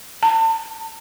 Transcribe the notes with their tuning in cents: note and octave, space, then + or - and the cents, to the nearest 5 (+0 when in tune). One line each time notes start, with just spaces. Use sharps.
A5 +35